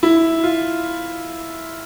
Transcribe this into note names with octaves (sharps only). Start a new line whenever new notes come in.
E4
F4